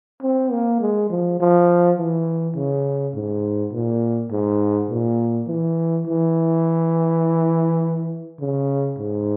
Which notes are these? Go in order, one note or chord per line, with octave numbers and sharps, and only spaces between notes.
C4
A#3
G#3
F3
F3
E3
C#3
G#2
A#2
G#2
A#2
E3
E3
C#3
G#2